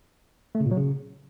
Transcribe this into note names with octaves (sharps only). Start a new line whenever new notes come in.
A3
C#3
A#2
F#3
C#3